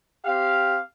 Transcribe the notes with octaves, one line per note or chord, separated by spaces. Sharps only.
C4 G4 F5